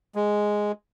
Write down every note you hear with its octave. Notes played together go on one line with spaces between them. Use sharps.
G#3